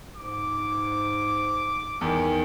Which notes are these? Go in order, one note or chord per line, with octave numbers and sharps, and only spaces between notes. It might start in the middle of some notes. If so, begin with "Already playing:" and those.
G#2 D6
E2 D#3